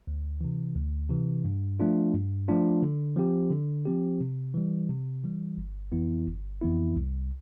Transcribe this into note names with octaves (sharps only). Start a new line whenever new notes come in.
D2
C3 E3
D2
C3 E3
G2
F3 A3 D4 F4
G2
F3 A3 D4 F4
D3
F3 C4 G4
D3
F3 C4 G4
C3
E3 G3
C3
E3 G3
G1
F2 E3 B3 E4
G1
F2 E3 B3 E4
C2